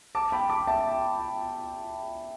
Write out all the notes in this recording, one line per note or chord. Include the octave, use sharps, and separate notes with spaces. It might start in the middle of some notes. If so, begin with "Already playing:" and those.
A5 D6
G5 B5
A5 D6
E5 A5